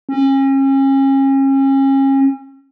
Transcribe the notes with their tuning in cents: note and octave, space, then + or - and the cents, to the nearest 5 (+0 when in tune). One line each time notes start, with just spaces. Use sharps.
C#4 -35